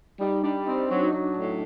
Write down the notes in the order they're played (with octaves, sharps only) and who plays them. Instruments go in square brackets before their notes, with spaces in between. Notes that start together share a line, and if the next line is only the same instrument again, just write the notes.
[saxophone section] G3 [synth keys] D#4
[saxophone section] G3 [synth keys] D4
[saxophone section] C4 [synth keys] D#4
[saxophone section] F#3 [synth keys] D#4
[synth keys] D4
D#4
[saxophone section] F#3
[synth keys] D4
[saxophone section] A2